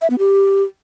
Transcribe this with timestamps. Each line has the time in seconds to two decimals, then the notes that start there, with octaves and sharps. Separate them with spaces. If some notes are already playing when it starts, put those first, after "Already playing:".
0.01 E5
0.10 B3
0.19 G4